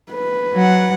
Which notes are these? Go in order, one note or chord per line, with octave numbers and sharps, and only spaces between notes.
B4
F#3 F#5